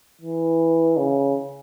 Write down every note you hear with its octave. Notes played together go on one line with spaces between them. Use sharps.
E3
C#3